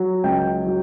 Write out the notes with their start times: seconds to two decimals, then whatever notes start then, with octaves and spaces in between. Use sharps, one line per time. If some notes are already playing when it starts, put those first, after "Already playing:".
Already playing: F#3
0.24 C#2 G5
0.66 F#3